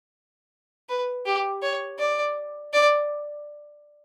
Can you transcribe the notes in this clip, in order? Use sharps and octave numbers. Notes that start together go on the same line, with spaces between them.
B4
G4
C#5
D5
D5